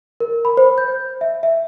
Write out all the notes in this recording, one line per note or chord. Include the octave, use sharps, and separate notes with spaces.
A#4
B5
C5
G6
E5
E5